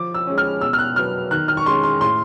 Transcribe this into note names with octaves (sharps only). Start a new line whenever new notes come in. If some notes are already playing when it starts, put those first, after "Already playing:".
Already playing: F3 D6
E6
G#3 C#4
F6
B2 E6
F6
F#6
F#3 B3 F6
D#3 F#6
F6
C#6
G#3 C#4 C6
C6
A2 C6